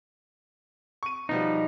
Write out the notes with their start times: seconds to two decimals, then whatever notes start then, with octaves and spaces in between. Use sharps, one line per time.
1.03 C#6 D#7
1.29 B2 F3 G3 D#4